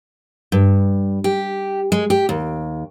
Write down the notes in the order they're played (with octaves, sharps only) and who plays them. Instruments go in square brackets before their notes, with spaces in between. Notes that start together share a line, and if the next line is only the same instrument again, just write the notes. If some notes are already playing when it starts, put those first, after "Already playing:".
[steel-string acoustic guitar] G2
G4
G#3
G4
D#2